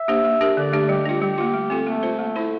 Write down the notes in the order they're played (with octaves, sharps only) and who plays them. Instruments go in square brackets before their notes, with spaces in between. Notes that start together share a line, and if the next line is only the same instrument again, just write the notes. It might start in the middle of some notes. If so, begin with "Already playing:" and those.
Already playing: [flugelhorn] E5
[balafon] A#3 D4 G4 C5
A#3
D4 G4 A#4
[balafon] D3 [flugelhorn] D5
[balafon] A3 D4 G4
[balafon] G3 [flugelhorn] G4
[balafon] D4 F4
[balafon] G3 [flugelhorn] G4
[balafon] A#3 F4
A3
C4 F4 A4
[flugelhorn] A3 [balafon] A#3
[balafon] F4 C5
[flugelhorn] A3 [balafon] A#3
[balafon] E4 A4 C5